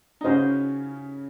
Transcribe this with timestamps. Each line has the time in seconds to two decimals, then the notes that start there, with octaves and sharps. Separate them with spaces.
0.21 D#4
0.24 C#3 C#4 F#4 C5 D#5